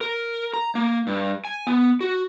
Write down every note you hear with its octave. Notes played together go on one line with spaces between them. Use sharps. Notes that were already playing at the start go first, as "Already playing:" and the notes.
A#4
A#5
A#3
G2
G#5
B3
F#4